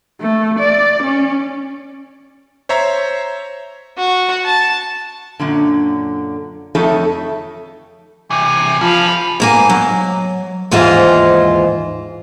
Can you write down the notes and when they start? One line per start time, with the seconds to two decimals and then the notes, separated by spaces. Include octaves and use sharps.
0.21 A3
0.59 D5
1.03 C#4
2.69 C5 C#5 E5 A#5
3.99 F#4
4.45 A5
5.40 F#2 A#2 D3
6.75 F2 A3 D#4 A4 C#5 A5
8.30 C3 E3 G#5
8.81 F3 G4 A4 F5 B5
9.40 G#2 A#3 G#5
9.70 F#3
10.71 D#2 G#2 E3 F4 C5 D#5